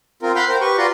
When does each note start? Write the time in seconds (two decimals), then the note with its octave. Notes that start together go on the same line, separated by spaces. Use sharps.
0.22 C4 F4 A#4
0.36 F5 F#5 B5 C6 F6 G6
0.49 A#4 C5 G5
0.61 G4 B4 C#6
0.78 F4 F#4 B4 D5 A#5 C6